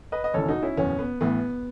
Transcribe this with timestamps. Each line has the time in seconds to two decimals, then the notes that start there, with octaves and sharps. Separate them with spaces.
0.12 B4 D#5
0.24 D#5
0.34 E1 D#2 C#3 E3 A4 C#5
0.48 D#4 F#4
0.63 C#4 E4
0.77 F#1 E2 B2 C#4
0.99 B3
1.21 A1 A2 E3 B3